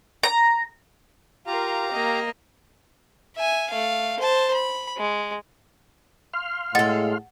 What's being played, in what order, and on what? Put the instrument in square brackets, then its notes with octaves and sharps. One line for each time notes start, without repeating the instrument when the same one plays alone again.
[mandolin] A#5
[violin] F4 A#4 [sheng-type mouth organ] G4 F5 A#5
[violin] A#3 D#5
[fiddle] E5 G#5
A3 F5
C5 A5
B5
G#3
[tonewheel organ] F5 C6 F6
[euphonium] A2 [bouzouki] G#3 A4 [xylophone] F#5 A6